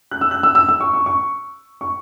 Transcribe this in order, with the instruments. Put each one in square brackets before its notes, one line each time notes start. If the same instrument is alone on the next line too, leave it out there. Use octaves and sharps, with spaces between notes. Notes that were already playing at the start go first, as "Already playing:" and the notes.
[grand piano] F#6
E6
F#6
E6
E6
E6
C#6
C#6
C#6
C#6